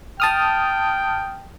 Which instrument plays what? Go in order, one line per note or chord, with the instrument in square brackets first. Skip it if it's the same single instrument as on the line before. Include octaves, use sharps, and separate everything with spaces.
[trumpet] G5 [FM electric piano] A5 D#6 F6